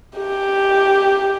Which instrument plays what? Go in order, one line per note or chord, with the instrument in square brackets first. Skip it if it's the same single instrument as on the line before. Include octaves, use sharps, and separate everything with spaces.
[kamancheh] G4